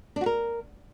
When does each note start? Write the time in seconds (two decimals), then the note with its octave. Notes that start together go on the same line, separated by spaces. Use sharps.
0.16 D4
0.21 F#4
0.26 A#4